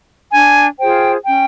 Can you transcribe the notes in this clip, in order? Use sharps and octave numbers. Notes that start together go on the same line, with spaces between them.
D4 G#5
F4 G#4 C5 G5
C#4 G5